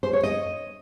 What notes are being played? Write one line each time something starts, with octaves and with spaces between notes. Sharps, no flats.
C5
C#5
D#5